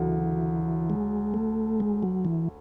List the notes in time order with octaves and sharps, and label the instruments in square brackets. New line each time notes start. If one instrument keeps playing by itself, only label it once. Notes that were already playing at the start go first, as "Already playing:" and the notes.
Already playing: [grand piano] D2 C#3 F#3 [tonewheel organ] E3
[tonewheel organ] G#3
A3
G#3
F#3
E3